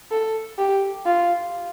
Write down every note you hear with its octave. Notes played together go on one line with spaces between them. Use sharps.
A4
G4
F4